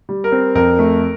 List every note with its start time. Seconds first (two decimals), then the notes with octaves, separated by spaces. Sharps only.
0.09 G3
0.24 A#4
0.32 C4
0.55 F2 A#4
0.79 A3